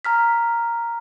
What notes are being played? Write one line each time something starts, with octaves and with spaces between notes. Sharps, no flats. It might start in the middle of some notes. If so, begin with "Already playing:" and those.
A#5 F6 B6